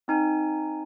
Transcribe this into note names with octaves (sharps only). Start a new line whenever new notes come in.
C4 D#4 G#5